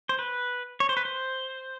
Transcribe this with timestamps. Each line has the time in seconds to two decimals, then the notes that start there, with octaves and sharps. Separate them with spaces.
0.09 C5
0.19 B4
0.80 C#5
0.89 C5
0.97 B4
1.05 C5